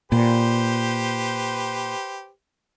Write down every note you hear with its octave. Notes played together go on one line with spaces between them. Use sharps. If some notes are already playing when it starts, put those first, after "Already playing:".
A#2 G4 B4 C5